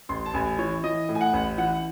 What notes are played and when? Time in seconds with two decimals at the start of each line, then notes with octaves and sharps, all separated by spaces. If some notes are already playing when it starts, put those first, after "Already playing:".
0.09 A1 C6
0.26 A5
0.34 A1 G#5
0.59 E3 C#5
0.84 E3 D#5
1.09 A2
1.15 G#5
1.21 F#5
1.33 A1
1.58 E3 F#5